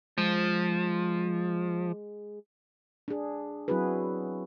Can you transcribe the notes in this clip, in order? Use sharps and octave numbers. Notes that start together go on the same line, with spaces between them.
F3 G#3
D4 G#4
F#3 C4 E4 F#4 G#4 B4